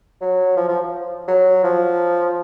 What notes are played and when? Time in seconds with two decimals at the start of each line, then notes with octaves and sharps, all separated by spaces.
0.21 F#3
0.57 F3
0.69 F3
1.28 F#3
1.64 F3